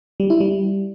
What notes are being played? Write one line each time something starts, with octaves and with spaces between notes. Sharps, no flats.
G3
E4
G3